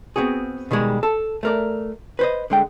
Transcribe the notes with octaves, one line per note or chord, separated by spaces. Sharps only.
B3 C4 F#4 G#4
B2 D#3 G3 G#3
A4
A3 A#4 D5
B4 C5 D#5
D3 G#3 G5